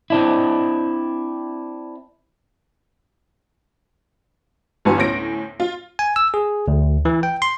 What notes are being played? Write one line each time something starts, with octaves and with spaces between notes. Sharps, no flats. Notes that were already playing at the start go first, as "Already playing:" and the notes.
C4 D4 E4
G1 G2 E3 F#4 B4 G#5
D2 A2 C#4 A#6 D7
F4
G#5
E6
G#4
D2
E3
G5
C6